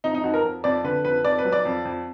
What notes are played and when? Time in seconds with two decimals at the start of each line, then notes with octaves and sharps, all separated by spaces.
0.04 F2 D#4
0.14 D#4
0.24 F2 F#4
0.34 A#4
0.44 F2
0.64 F2 D5
0.84 D3 B4
1.05 F2 B4
1.25 F2 D5
1.39 B4
1.45 F#3
1.52 D5
1.65 F2
1.85 F2